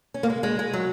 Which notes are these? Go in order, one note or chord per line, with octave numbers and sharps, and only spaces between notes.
C#4
A#3
G#3
G#3
G#3
F#3